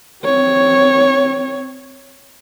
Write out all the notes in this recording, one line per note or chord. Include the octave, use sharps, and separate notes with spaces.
C4 C#5